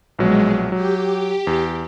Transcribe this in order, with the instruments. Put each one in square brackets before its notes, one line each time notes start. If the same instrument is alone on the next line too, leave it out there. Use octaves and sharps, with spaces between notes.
[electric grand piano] A#1 B2 F#3 [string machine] G#3
[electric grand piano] F#3 [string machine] G4
[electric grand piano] E2